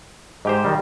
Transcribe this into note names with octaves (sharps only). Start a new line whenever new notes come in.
G#2 G4 C5 D#5
D#3 G3